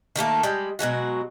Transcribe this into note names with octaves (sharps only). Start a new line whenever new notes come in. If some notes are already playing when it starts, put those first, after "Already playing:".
D#3 G3 A3 A#3
G3 G#3
B2 F#3 G#3 F#4